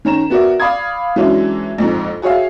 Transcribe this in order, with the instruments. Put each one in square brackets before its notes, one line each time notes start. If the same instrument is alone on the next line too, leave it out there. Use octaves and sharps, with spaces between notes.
[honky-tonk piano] D#3 C#4 A#5 E7
B3 F#4 A#4 D5 E5
D5 F5 B5 D#6 G#6
E3 F#3 G#3 C#4 D4 E4
A#1 F2 G#2
F#4 G#4 C#5 E5 F5